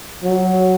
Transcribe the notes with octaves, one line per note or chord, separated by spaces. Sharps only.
F#3